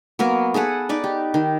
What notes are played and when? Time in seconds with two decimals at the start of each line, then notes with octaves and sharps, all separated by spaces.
0.19 F#3 A#3 B3 A#4
0.54 G#4 A4 B4 F#5
0.89 D#4 B4 D5
1.04 G4
1.34 D#3